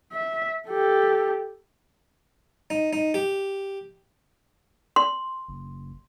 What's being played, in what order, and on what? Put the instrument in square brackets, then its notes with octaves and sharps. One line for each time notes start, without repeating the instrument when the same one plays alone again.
[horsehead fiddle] E5
G4 A4
[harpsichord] D#4
D#4
G4
[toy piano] C6
[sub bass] F#1